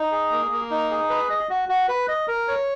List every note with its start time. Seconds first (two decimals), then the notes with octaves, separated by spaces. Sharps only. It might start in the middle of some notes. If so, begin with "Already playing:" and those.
Already playing: D#4
0.12 G#4
0.31 A#3
0.51 A#3
0.70 D#4
0.90 G#4
1.10 B4
1.30 D#5
1.50 F#4
1.69 F#4
1.88 B4
2.08 D#5
2.28 A#4
2.48 C#5